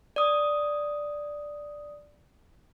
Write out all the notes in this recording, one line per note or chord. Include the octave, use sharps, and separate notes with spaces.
D5 D#6